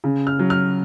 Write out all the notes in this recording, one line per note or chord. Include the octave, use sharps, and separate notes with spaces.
C#3
F6
F#3
F6